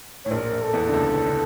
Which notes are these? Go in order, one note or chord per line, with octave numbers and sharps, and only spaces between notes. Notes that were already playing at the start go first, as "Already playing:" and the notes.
A2 C#5
A#1 A#2 A#4
A#1 A#2
A4
E2 E3
D3
C#2 C#3
E3
D3